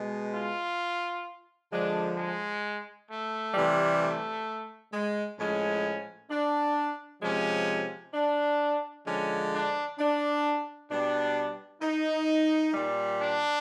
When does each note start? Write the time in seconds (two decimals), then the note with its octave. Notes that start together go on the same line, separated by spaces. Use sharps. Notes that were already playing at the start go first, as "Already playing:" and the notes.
Already playing: B2 G#3
0.32 F4
1.70 D3 F3 G#3 D4
2.16 G#3
3.08 A3
3.54 C3 E3 G3
4.00 A3
4.92 G#3
5.38 A2 F3 G#3 C#4
6.30 D4
7.22 C3 F3 G#3 C#4
8.14 D4
9.06 D3 F3 G#3 C#4
9.52 D4
9.99 D4
10.90 B2 G3 D4
11.82 D#4
12.74 A#2 G3
13.20 D4